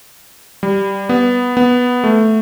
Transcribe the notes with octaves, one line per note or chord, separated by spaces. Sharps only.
G3
B3
B3
A3